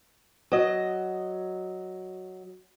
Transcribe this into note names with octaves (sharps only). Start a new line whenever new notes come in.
F#3 D#5